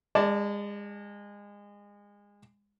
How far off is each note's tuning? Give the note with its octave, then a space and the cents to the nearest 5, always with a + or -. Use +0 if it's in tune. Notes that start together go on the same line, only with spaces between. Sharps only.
G#3 -30 D5 +10 A5 +0